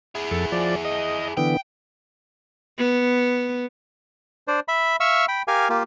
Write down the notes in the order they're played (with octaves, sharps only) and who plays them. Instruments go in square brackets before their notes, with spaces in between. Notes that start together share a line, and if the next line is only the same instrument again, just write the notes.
[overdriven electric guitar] E4 G#4
[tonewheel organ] F2 A4
F3 D5
D#5
[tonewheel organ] D3 E3 B3 [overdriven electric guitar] G5
[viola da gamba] B3
[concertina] D4 C5 D5
E5 B5
E5 F5 C#6 E6
G5 B5
G4 A#4 F5 G#5
A#3 F4 G4